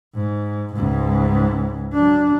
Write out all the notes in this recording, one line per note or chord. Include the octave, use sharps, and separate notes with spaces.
G#2
C#2 G#2
F#3 D4